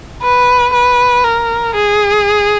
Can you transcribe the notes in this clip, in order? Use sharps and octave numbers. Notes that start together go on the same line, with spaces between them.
B4
B4
A#4
G#4